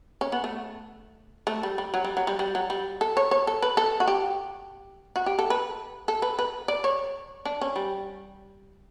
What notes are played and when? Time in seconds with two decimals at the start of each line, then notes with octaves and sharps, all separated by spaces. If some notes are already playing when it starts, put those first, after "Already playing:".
0.21 C#4
0.32 B3
0.44 A3
1.47 A3
1.63 G3
1.78 G3
1.94 F#3
2.05 G3
2.17 F#3
2.27 G3
2.39 G3
2.55 F#3
2.70 G3
3.01 A4
3.17 C#5
3.31 C#5
3.47 A4
3.62 B4
3.77 A4
4.00 F#4
4.08 G4
5.16 F#4
5.26 G4
5.39 A4
5.50 B4
6.08 A4
6.22 B4
6.39 B4
6.68 D5
6.84 C#5
7.45 D4
7.61 C#4
7.76 G3